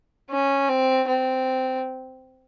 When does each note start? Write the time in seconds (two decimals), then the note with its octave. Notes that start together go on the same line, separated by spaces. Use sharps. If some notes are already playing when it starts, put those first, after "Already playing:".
0.30 C#4
0.68 C4
1.07 C4